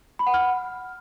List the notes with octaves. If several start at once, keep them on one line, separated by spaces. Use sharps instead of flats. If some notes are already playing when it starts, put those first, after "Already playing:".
B5
F#5
F6